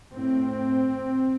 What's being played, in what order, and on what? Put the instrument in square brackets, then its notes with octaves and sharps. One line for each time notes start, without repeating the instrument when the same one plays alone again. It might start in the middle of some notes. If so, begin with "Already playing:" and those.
[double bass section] A2 C4